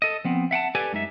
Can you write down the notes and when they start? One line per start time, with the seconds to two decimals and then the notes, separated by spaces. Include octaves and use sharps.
0.02 A4 D#5
0.25 F3 B3 C4
0.51 E5 F#5 G5 A5
0.75 G4 A4 B4 D5 G#5
0.93 F#2 G#3 D#4 E5